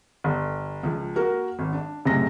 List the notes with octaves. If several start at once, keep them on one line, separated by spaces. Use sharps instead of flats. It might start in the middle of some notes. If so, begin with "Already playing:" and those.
G1
C#2 F3
A#3 F#4 A#4
G#1
D4
F#1 A2 C3 G#3 A#6